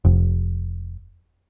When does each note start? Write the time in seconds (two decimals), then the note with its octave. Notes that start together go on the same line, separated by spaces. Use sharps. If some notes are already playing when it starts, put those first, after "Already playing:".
0.05 F1